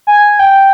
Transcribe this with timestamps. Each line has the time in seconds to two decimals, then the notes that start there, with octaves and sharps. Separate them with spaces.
0.07 G#5
0.39 G5